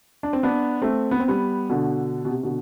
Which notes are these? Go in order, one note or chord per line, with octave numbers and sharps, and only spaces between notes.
D4
C4
B3 D4
A3 C4
B3
C4
G3 B3
B2 D3
B2
C3
B2 D3